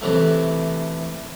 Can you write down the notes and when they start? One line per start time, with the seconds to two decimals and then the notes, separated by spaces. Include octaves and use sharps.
0.01 C3 E3 A3